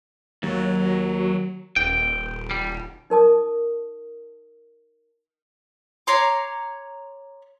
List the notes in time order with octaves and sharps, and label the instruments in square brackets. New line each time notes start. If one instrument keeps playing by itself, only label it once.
[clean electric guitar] D#2 [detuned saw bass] F#3
[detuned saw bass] D#1 [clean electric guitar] G5
[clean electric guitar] G3
[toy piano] D#4 A#4 A5 D#6
[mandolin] C#5 A#5 C6 D6